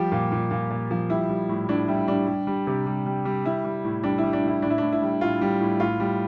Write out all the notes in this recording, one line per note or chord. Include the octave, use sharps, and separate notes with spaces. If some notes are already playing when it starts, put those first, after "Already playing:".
Already playing: F3 G3 G4
A#2
A#2
A#2
A#2
F3
G3 E4
G3
A2
A2 D4
G3 E4
G3 D4
G3
G3
C3
G3
G3
G3
G3 E4
G3
A2
G3 D4
E4
G3
D4
A2 E4
A2 D4
E4
D4
A2
E4
G3
A2 F4
G3
A2
A2 F4
G3